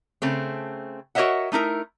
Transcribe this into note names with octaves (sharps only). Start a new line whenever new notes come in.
C#3 A3 C4
F#4 A#4 C#5 D#5 E5 F#5
A3 D#4 E4 A#4